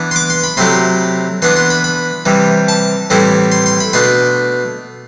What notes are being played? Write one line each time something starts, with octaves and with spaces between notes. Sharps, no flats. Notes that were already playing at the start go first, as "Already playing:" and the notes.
Already playing: E3 B3 D4
C6
D6
C6
B5
C3 F#3 A3 E4 C6
E3 B3 D4 C6
C6
B5
B5
C3 E3 G3
A5
A2 E3 G3 C4 E4
C6
C6
B5
B2 A3 D4 C6